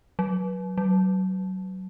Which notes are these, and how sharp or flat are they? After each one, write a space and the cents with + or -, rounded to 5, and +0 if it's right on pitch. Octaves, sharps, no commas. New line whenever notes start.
F#3 -5
F#3 +25